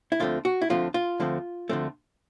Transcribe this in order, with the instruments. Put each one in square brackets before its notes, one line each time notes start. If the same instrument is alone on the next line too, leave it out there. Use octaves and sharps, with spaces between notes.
[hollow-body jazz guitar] E4
D2 D3 F3 A3 C4 F4
F#4
E4
D2 D3 F3 A3 C4 F4
F4
D2 D3 F3 A3 C4
D2 D3 F3 A3 C4